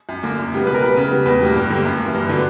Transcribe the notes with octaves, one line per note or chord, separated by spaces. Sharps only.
F#2
D3 A#3
F#2
C#3 G3 B3
B2 B4
A#4
G3 B3 B4
C#3
G3 B3
E2 B4
B2 G3 A#3
G2
D3 G3 A#3
F#2
A#3
E3
G2
D3 F#3 B3